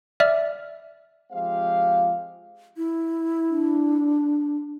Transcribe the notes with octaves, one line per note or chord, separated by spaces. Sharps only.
D5 E5 F6
F3 G#3 C4 G4 F5
E4
D4